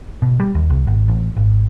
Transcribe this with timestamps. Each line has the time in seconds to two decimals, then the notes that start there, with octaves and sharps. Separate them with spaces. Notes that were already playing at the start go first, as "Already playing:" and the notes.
0.22 B2
0.40 G3
0.55 D#2
0.70 C2
0.87 G#1
1.08 A1
1.37 G#1